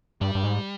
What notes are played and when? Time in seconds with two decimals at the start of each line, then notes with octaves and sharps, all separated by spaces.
0.21 G2 G3
0.35 G2
0.43 G#2